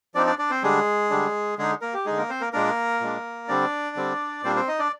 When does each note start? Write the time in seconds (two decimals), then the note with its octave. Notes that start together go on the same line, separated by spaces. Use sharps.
0.15 F3 C4 D4 D#4 D5
0.26 D4 D5
0.38 D4 D5
0.50 C4 C5
0.63 D3 G3 G#3 D4 G#4
1.10 D3 G3 D4
1.58 D3 G#3 D#4 G#4
1.81 A#3 A#4
1.94 G4
2.06 D3 G#3 D#4 G#4
2.17 A#3 A#4
2.29 C4 C5
2.41 A#3 A#4
2.53 A#2 G#3 A#3 D4 A#4
3.01 A#2 G#3 D4
3.48 D3 G3 C4 D4 D5
3.96 D3 G3 C4
4.44 A#2 G3 A#3 C4 D4 C5
4.56 C4 C5
4.68 D#4 D#5
4.79 D4 D5